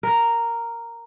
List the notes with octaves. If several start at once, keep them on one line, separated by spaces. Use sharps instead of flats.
A#4